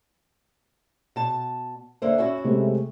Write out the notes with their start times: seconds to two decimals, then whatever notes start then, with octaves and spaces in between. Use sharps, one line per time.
1.16 B2 A5
2.02 D3 A#3 C5 E5
2.18 C#4 E4 F#4
2.44 C3 G#3 A3